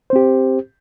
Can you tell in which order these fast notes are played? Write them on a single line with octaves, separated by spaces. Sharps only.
C5 C4 G4